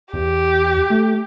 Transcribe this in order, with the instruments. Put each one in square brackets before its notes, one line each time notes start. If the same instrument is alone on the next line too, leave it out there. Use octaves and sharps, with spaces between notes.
[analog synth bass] E2 [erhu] G4
[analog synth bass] A3